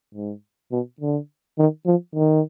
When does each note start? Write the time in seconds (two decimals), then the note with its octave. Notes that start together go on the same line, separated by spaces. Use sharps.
0.15 G#2
0.72 B2
1.00 D3
1.58 D#3
1.86 F3
2.15 D#3